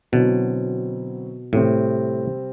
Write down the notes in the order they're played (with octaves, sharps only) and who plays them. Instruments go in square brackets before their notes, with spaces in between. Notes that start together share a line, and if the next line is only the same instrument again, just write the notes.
[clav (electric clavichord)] B2 [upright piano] D3 F#3 C4 E4
[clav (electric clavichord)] A2 [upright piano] C3 G3 C4